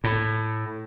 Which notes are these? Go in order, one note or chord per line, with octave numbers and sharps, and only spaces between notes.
A2